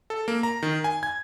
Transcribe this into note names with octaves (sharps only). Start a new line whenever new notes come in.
A4
A#3
A#5
D#3
G#5
G#6